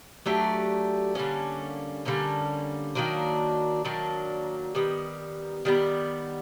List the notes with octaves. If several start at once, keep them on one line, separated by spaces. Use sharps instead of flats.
F#3 A3 D4 G4
D3 G3 A#3 C#4
D3 G3 A#3 C#4
D#3 F#3 A#3 D4
D#3 F#3 A#3 D4
D#3 G3 B3
D#3 G3 B3